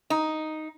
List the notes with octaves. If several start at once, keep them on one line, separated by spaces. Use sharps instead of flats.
D#4